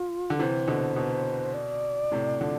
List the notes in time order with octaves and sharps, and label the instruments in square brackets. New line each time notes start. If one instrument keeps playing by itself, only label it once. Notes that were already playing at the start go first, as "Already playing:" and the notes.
Already playing: [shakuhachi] F4
[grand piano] D3
[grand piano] C3 E3 [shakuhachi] C5
[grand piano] B2 D3
B2
[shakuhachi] D5
[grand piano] A2 C3
D3 F3